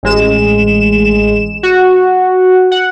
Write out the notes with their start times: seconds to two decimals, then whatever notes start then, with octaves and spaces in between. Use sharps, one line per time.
0.03 A1 G#3 E7
1.63 F#4
2.71 F#5